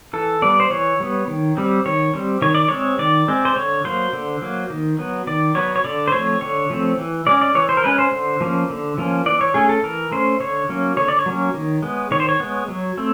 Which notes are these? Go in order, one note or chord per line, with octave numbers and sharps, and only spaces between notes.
E3 A4
G3 B3 D5
C5
E3 C#5
G3 B3
D#3
G3 C4
D#3 C#5
G3 C4
D#3 C#5
D5
G#3 C4 C#5
D#3 D5
G#3 C4
C5
D3 C#5
F#3 A#3 C5
D3
F#3 A#3
D#3
F#3 B3
D#3 D5
F#3 B3 C#5
C#5
D3 D5
C5
F3 A3 C4 C#5
D3 C#5
F3 A3 C4
E3
G#3 C#4 D5
D5
E3 C#5
C5
A#4
G#3 C#4 B4
C5
D3
F3 A#3 C#4
D3
F3 A#3 C#4
E3 D5
C#5
A3 C#4 G#4
A4
E3 A#4
A3 C#4 C5
D3 C#5
F#3 A#3 C#4
D3 C#5
D5
C#5
F#3 A#3 C#4
D#3
G#3 B3
D#3 C#5
C5
C#5
G#3 B3
F#3
A3 C4